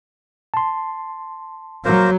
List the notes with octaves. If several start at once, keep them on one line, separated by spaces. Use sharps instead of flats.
A5 C6
F#3 A#3 A#4 C5